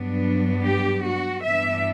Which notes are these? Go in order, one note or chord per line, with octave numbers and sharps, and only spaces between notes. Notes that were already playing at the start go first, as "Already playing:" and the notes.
Already playing: G2 F#3 B3 D4
G4
F#4
G2 E3 B3 D4 E5